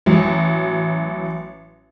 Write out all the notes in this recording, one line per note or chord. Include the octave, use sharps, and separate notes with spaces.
A1 F#3